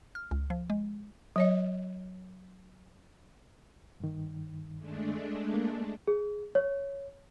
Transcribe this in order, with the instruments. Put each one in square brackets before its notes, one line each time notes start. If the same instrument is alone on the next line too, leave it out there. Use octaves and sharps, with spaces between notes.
[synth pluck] F6
C#2
F3
G#3
[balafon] F#3 C#5 D#5
[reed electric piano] G2 D#3
[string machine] G#3 A3 D4
[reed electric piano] A#3
[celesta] G#4
C#5